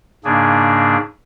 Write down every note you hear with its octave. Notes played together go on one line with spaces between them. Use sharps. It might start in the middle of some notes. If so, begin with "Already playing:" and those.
G#2 C#3 A#3 D4 G#4